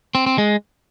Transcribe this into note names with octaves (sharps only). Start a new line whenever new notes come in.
C4
C4
G#3